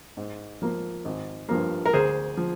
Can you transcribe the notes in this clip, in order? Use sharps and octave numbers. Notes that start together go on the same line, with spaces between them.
G#2
F3 A#3
G#1
G2 F3 A#3
A#4
D2 G#4 C5
F3